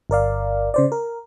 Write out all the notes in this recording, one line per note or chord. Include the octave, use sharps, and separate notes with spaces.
G1 A#4 D5 F5
C#3 C5 D5
A#4